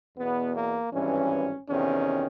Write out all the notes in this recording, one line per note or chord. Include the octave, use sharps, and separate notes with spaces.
E2 B2 B3
A#3
G#1 G2 E3 C#4
E2 C3 D#3 C#4